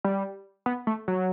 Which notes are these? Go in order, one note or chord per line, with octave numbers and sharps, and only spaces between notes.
G3
B3
A3
F#3